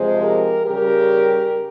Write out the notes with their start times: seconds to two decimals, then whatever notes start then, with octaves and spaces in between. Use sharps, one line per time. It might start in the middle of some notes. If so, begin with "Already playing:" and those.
Already playing: C3 F3 G#3 G#4 C5
0.23 G4 A#4
0.67 C#3 G3 G4 A#4